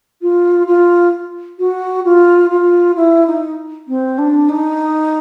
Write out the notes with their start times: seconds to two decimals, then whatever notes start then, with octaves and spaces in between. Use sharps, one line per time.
0.21 F4
0.67 F4
1.59 F#4
2.05 F4
2.50 F4
2.96 E4
3.27 D#4
3.87 C4
4.18 D4
4.49 D#4